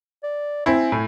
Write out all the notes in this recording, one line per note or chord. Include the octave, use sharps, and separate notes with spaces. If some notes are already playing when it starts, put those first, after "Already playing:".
D5
C4 E4 G#5
A2